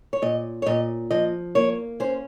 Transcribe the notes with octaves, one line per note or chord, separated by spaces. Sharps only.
C#5
A#2 D#5
C#5
A#2 D#5
F3 D#5
A#3 C#5
C#4 C5